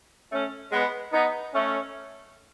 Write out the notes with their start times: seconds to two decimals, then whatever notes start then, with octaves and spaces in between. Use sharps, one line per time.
0.32 A3 C#4
0.72 G#3 B3
1.13 B3 D#4
1.53 A3 C#4